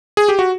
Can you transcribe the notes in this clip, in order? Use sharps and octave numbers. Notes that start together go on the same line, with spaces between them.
G#4
G4
F#4